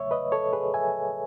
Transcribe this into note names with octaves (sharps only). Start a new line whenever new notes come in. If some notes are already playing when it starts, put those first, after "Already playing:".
Already playing: E2 C#3 F#3 A3 C#5 E5
B4 D#5
A4 C#5
G#4 B4
E5 G#5